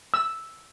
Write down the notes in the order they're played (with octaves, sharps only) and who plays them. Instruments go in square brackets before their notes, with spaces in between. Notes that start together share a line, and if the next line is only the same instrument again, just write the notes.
[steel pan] E6